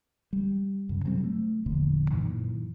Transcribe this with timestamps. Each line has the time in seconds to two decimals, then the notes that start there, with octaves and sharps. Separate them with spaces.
0.33 G3
0.89 F#2 C#3
1.05 C3 F#3 G3 C4
1.24 A3
1.66 E1 A#1 E2 D3
2.11 F#2 A#2 D#3 E3